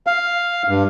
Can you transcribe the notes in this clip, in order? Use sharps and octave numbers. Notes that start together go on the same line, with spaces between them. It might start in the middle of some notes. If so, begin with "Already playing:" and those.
F5
G2